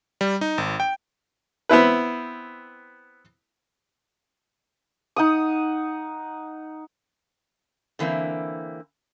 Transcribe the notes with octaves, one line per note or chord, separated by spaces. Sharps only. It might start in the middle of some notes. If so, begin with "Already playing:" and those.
G3
D#4
G#1
G5
B3 C4 E4 B4
D#4 F#5 D#6
D3 E3 A#3 C4 E4